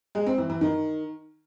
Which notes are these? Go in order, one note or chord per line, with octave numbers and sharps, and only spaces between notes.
G#3
C4
E3
E3
D#3